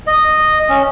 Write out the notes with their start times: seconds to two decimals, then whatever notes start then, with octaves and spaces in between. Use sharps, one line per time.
0.07 D#5
0.69 C#4